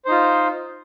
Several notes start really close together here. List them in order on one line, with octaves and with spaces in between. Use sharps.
C5 D#4 F4